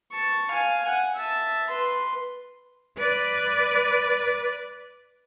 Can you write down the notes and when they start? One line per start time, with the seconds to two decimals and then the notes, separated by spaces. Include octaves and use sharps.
0.12 A5 C#6
0.51 F5 G#5
0.84 F#5 G#5
1.15 E5 A5
1.69 B4 C6
2.98 B4 D5